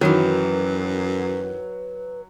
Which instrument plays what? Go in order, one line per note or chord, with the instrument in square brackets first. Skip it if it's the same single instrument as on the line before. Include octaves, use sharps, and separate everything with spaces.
[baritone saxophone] F#2 [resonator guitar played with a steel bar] D#3 E3 [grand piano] F#3 [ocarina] B4